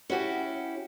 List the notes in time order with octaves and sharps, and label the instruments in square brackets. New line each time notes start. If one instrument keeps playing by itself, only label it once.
[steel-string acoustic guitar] C#4 E4 F#4 G4